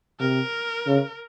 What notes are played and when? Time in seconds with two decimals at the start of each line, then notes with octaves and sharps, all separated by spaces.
0.20 C3 A#4
0.87 C#3